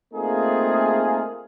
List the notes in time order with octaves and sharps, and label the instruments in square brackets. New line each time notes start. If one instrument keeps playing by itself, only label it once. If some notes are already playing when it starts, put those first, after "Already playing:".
[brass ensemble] A3 A#3 C4 D#4 F4 G#4